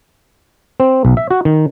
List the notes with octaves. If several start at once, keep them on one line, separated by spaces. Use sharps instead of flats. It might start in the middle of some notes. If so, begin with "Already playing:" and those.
C4
B1
E5
F#4
D#3